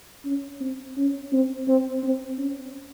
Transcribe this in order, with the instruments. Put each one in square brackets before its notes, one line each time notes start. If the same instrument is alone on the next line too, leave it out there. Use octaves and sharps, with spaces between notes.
[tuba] C#4
C4
C#4
C4
C4
C4
C#4